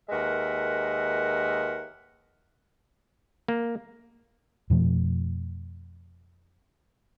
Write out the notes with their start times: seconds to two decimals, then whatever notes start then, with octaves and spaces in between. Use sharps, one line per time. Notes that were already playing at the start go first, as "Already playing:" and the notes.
0.10 D#2 G#3 A#4 B4 E5 F#5
3.48 A#3
4.70 F2 B2 F3 A3